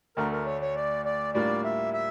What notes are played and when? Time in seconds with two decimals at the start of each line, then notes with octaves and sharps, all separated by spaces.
0.17 D2 D3 A3 A#4
0.32 A#4
0.46 C#5
0.62 C#5
0.76 D5
1.05 D5
1.34 A2 G3 A#3 D4 F4 D5
1.64 E5
1.94 E5